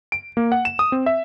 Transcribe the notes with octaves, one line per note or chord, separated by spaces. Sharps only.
D7
A#3
F#5
E7
D#6
C4
E5